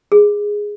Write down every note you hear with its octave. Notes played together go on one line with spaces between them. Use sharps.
G#4